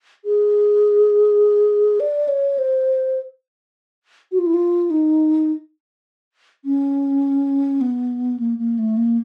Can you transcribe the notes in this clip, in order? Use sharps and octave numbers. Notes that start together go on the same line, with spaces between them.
G#4
D5
C#5
C5
F#4
F4
E4
F4
D#4
C#4
B3
A#3
A#3
A3
A#3